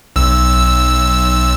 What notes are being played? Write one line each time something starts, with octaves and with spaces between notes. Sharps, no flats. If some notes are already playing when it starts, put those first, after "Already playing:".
B1 E6